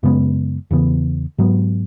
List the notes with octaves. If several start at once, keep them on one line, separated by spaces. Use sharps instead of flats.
F#2 C#3 G#3 B3
E2 C#3 E3 B3
G#2 F#3 B3